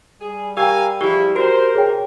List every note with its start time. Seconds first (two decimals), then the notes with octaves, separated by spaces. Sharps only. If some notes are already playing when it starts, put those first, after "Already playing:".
0.21 G3 G#4
0.57 G4 A#4 F5 G5 G#5 E6
1.01 F3 G#3 E4 G4 G7
1.36 F#4 A#4 C5
1.75 C3 G#4 C#5 G5